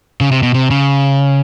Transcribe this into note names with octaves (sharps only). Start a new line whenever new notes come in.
C#3
C3
B2
C3
C#3